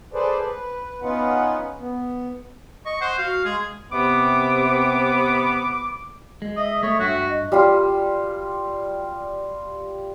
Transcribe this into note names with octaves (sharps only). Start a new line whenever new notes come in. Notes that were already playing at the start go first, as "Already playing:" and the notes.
G#4 A4 B4 C5 D5
B4
B3 C#4 D#4 F4 B4 F#5
B3
D#5 C#6
C5 F#5
F#4 F5
G#3 G#4
C3 B3 D6
G#3
D#5 E5
A3 C#5
G2 F#4
D#5
G3 F4